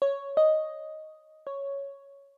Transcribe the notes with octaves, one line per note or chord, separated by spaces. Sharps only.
C#5
D#5
C#5